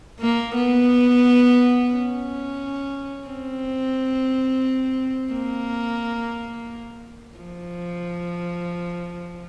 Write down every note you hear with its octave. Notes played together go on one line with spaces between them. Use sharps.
A#3
B3
C#4
C4
A#3
F3